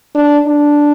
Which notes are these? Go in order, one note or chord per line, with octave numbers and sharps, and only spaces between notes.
D4
D4